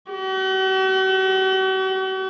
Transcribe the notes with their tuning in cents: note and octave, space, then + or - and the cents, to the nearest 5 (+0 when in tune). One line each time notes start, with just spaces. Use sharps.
F#4 +45